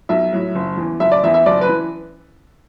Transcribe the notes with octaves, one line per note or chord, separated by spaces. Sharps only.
B1 E5
A2 F#3
F#1
E2 E3
F#1 E5
D5
E2 E3 E5
E5
F#1 D5
B4
E3